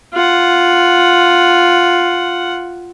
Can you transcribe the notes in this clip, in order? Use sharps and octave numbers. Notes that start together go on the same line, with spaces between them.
F4 F#5